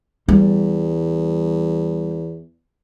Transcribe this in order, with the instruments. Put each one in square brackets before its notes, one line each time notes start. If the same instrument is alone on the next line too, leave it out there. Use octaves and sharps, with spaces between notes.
[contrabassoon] E2 [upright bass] G3